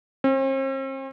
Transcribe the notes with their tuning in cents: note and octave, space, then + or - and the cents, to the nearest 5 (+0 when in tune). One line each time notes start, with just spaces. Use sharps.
C4 +45